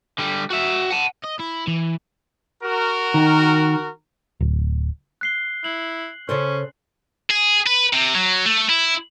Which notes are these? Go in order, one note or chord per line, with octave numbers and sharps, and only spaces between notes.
D3 G3
F#4 E5
F#5 A5
D#5
E4
E3
F#4 A#4
D#3
D1
F#6 C7 G7
E4 F#7
C#3 C#4 A4 C5
G#4
B4
C3
F#3
A3
E4